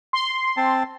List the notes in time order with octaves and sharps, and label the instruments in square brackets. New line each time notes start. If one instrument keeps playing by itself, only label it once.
[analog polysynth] C6
[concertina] C4 A5